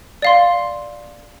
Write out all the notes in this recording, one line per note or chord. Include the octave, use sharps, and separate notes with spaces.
D5 F5 C6